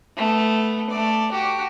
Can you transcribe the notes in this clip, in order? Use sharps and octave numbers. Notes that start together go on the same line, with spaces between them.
A3 B3
A3 D5
F#4 G4